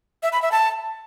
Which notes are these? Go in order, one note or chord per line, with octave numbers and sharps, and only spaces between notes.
E5
B5
E5
A5